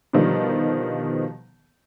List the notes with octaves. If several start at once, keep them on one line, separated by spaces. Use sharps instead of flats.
B2 D3 D#3 F3 G3